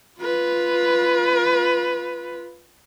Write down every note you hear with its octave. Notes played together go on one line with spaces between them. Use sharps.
F4 B4